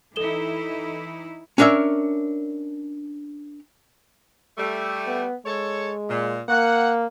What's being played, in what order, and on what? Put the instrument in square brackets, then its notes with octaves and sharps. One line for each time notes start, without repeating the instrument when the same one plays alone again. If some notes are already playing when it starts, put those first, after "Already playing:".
[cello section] E3 D#4 E4 [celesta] A4 E7 G7
[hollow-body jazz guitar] C#4 D4 A#4 C#5 E5
[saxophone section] G3 A3
[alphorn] B3
[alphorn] G#3 [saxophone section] A4 C#5
[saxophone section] A#2
[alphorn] A#3 [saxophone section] F#5